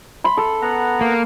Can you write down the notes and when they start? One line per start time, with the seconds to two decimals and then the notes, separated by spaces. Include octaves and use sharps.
0.24 B5 C6
0.37 A4
0.62 B3 F#5 A#5
1.01 A#3